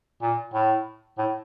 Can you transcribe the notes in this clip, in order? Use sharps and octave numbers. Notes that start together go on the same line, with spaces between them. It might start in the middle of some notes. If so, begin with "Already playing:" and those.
A#2
A2
A2